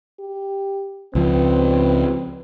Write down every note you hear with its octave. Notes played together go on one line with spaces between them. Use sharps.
G4
C#2 F3 C4 B4